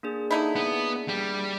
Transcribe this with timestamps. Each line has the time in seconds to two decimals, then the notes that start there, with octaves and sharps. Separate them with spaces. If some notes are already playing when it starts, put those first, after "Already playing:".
0.03 A#3 D4 G#4
0.31 D3 D#4 E4
0.56 B3
1.08 G3